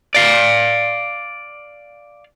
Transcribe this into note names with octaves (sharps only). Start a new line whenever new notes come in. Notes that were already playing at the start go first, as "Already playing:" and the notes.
D5 F5